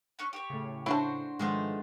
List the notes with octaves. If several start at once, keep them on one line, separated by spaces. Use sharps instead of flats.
C#4 C#6 F#6
G4 C#5
A2 C#3
D4 E4 F#4 C5 A5
G#2 D#3 F3 G#3 A3 B3 F4 C5